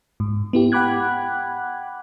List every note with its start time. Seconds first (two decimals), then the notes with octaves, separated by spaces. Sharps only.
0.20 G#2
0.53 B3 E4 G4
0.72 F#5 G5 B5 D6 F#6 G#6